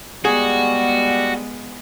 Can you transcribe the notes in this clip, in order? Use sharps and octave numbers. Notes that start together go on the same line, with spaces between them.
G3 G#3 B3 F#4 G#4